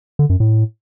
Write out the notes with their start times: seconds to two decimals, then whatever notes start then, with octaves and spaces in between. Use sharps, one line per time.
0.19 D3
0.30 F#2
0.40 A2